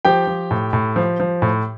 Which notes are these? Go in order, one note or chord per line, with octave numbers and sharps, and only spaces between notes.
F3 G4 G5
F3
A2
A2
F3
F3
A2